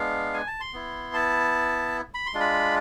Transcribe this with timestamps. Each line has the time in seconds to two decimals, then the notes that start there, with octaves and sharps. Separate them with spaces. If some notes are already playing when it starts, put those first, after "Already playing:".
Already playing: G#3 B3 D4 F5
0.34 G#5
0.47 A5
0.60 C6
0.73 B3 E4
1.14 A5
2.14 B5
2.26 C6
2.34 G#3 D4 F4
2.40 B5